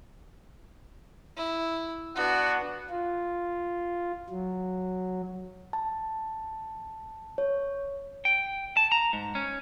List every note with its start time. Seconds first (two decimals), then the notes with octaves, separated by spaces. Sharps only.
1.37 E4
2.15 B3 D4 F#4 F#5
2.90 F4
4.29 F#3
5.73 A5
7.38 C#5
8.25 G5
8.77 A5
8.92 A#5
9.13 G#2
9.35 C#4